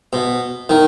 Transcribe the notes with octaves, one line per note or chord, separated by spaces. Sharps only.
B2
D#3